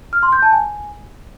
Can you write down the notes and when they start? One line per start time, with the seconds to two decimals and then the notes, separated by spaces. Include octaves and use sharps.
0.13 F6
0.23 C6
0.33 G6
0.42 A5
0.52 G#5